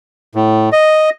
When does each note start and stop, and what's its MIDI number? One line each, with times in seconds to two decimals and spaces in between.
0.35 0.69 45
0.72 1.10 75